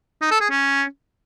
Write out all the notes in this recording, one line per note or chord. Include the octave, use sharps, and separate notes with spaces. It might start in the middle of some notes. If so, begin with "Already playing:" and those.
D#4
A4
G#4
C#4